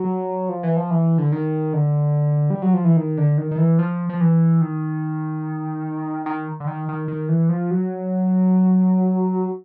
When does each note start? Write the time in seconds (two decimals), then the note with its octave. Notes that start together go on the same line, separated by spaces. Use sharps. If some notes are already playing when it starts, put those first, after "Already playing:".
Already playing: F#3
0.49 F3
0.63 E3
0.77 F3
0.91 E3
1.18 D3
1.32 D#3
1.73 D3
2.50 G3
2.62 F#3
2.74 F3
2.84 E3
2.97 D#3
3.17 D3
3.38 D#3
3.51 D#3
3.58 E3
3.79 F3
4.09 F3
4.21 E3
4.61 D#3
6.26 D#3
6.60 D3
6.67 D#3
6.88 D#3
7.08 D#3
7.29 E3
7.49 F3
7.71 F#3